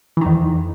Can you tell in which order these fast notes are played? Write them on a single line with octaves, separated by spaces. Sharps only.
E3 D#3 F2